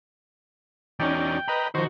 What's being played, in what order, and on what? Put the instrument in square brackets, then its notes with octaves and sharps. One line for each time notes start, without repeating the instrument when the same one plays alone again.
[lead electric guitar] E2 F#4 [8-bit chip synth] C#4 D#4 D5 [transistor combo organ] G5
[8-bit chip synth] B4 D#5 B5 [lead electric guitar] A#5
[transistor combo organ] D#3 [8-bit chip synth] F3 C5 [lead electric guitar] F#4